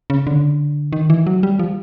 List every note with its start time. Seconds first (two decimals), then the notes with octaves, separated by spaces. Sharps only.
0.10 C#3
0.27 D3
0.93 D#3
1.10 E3
1.27 F#3
1.43 G3
1.59 F3